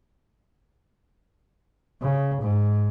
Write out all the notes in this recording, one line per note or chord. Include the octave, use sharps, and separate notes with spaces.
C#3
G#2